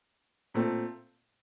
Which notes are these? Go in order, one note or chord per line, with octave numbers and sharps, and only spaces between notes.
A#2 A3 C4